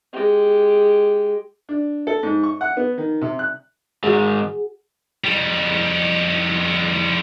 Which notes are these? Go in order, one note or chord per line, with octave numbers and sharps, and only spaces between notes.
G#3 G4
D4
A4
G#2
C#6
F#5
B3
D#3
C3
F#6
G#2 D#3 F#4 G#4
F2 G3